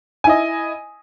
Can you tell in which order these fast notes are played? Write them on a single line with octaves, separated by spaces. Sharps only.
G#5 E4 D#5